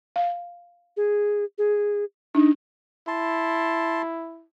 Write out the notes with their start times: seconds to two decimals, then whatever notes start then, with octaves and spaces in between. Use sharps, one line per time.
0.16 F5
0.97 G#4
1.58 G#4
2.35 D4 D#4
3.08 E4 A5 C6